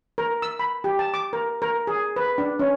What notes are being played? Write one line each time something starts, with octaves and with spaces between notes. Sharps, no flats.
A#4
E6
B5
G4
A5
D6
A#4
A#4
G#4
B4
D4
C#4